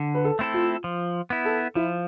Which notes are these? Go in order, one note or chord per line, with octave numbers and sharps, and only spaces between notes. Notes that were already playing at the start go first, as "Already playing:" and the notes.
Already playing: D3
B4
A4
A3 C4 E4 A4
F4
F3
B3 E4
A4
F3 E4